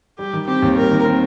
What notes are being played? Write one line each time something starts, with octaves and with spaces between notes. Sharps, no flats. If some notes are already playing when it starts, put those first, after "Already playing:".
G3 G4
D#3
C4 G4
D#2
G3 A#4
D#3
C4